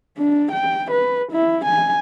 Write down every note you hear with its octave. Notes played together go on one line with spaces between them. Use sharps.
D4
G5
B4
E4
G#5